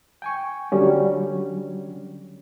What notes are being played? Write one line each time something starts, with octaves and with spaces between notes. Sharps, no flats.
G5 G#5 C#6
D3 F#3 G3 C#4